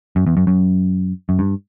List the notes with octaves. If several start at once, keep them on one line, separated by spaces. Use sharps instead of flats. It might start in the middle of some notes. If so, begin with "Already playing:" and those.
F#2
E2
F#2
F#2
F#2
G2